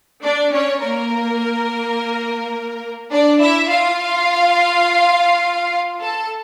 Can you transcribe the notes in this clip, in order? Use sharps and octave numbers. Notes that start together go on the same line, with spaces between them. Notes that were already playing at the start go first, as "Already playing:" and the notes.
D4 D5
C#4 C#5
A#3 A#4
D4 D5
E4 E5
F4 F5
A4 A5